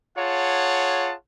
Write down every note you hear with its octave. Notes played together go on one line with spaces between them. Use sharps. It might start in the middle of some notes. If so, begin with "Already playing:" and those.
F4 G#4 C#5 F#5 A5